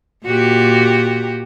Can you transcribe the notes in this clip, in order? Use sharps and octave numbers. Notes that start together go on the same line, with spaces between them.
A#2 F#4 G4